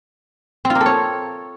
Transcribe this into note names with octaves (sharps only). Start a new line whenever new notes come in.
C4
F4
A#3
A4
C#5